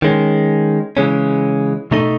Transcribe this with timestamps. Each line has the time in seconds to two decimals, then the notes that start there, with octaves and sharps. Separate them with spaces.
0.02 D#3 G#3 C#4
0.97 C#3 E3 G#3 C#4
1.91 B2 A3 D#4 A4 D#5